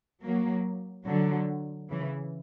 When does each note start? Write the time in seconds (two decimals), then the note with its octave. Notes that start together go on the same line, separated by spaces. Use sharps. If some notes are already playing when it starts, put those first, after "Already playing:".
0.25 F#3 A#3
1.07 D3 F#3
1.90 C#3 E3